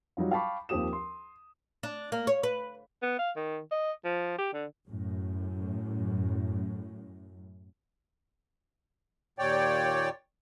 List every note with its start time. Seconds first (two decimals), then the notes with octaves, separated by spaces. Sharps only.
0.17 F#3 G3 D#4 F4
0.31 F5 G5 A5 B5 C#6 D6
0.69 D#2 F3 C4 G4 D#6 E7
0.93 C6
1.83 D4
2.12 A#3
2.27 C#5
2.43 B4
3.02 B3
3.19 F5
3.36 D#3
3.71 D#5
4.05 F3
4.38 G4
4.53 D3
4.90 F#2 A2
9.39 D#2 A#2 C#5 D5 G5